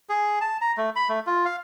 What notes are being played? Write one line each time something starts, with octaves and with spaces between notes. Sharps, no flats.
G#4
A5
A#5
A3
B5
A3
F4
F5